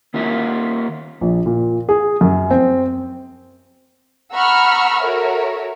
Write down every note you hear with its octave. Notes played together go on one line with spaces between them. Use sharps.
D#3 A#3 F4 A#4 E5 G#5
A#1
A#2
G#4
F#2
C4
F#5 A#5 B5 C#6 E6 F6
F#4 A4 A#4 C#5 E5